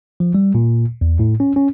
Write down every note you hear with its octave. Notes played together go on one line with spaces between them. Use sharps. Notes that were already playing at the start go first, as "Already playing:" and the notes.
F3
G3
A#2
E2
A2
C#4
C#4